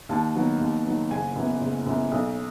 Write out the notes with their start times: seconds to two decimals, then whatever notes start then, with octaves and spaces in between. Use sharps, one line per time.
0.09 D#2 A5
0.35 D#3 F#3 B3
0.61 D#2
0.85 D#3 F#3 B3
1.10 F#1 G#5
1.36 F#2 E3 B3
1.61 F#1
1.86 F#2 E3 B3
2.12 B1